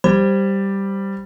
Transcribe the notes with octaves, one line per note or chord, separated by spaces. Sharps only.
G3 C5